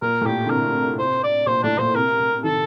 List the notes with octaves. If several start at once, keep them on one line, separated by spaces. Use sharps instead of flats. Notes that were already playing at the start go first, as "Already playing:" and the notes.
A#2 A#4
A2
A#2 G4
D3
C3 A#4
C5
D5
A#2 C5
A2 D4
A#2 C5
C3 A#4
C3
D#3 A4